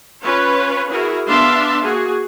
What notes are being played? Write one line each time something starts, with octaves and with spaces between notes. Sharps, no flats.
C#4 F4 B4 C#5
E4 F#4 G#4 A#4
B3 D4 E5 F5 A5 C6
A#3 F#4 G#4